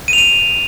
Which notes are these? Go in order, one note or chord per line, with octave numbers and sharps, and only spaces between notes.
D#7
F7
D#7